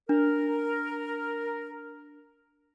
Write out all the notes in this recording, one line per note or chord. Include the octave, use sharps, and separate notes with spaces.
D4 A#4